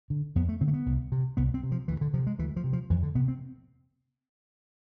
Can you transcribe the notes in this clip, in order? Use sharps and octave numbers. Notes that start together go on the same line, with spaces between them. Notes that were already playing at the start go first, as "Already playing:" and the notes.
D3
F2 B3
A3
D3 C4
A3
B3
C2
C3
C2 B3
C4
C3
F3
D2 E3
D3
C3 F3
G#3
D2 E3
F3
C3
F3
F2 E3
D3
C3 B3
C4